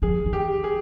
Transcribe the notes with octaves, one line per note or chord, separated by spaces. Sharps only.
F3 G#4
D#3
G4
G#4